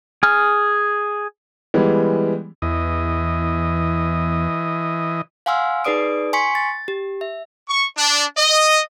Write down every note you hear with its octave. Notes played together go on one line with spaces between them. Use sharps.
G#4 F6
E3 G3 G#3 B3
E2 E3 D#5
F5 F#5 G#5 C6 E6 F6
D#4 G#4 B4 D5 D#6 D7
G#5 C6 C#6 B6 C#7
A6
G4
E5
C#6
D4
D#5